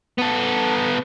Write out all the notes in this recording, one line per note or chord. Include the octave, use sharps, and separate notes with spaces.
B3 A4